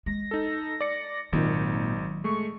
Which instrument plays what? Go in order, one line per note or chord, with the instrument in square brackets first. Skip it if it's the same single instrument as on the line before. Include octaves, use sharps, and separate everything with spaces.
[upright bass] G#3 [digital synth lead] A#6
[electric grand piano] D#4 A4
D5 C#7
[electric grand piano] G#1 D#4 [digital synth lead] A#2 [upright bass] D#3 F#3
[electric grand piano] G#3 A3 [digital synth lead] C#6